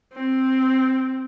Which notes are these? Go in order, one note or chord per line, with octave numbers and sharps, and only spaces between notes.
C4